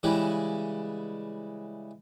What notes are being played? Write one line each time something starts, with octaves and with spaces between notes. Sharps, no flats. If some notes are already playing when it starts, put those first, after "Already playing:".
C#3 E3 G3 G#3 E4